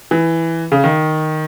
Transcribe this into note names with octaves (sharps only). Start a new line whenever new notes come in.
E3
C#3
D#3